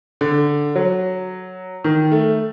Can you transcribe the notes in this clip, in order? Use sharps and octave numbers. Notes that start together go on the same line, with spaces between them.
D3
F#3
D#3
A3